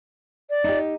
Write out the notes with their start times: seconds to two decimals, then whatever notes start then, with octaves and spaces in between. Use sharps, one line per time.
0.50 D5
0.64 D#4 G4